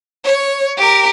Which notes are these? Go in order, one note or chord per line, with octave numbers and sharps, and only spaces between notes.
C#5
G4 A#4